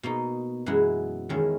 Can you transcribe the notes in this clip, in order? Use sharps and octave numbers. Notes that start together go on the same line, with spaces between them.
B2 A#3 D#4
F#2 E3 G#3 B3 E4
E2 D#3 G#3 C#4 E4